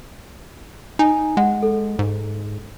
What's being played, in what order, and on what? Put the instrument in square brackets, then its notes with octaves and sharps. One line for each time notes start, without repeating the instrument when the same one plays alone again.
[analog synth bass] D#4 [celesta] G#5
[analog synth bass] G#3 [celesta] F#5
[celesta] A4
[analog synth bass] G#2